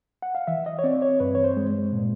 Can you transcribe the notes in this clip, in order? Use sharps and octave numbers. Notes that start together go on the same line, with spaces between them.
F#5
F5
E3 E5
D#5
C#5
C4 D5
C#5
G2 B4
C#5
C5
G#3
A#2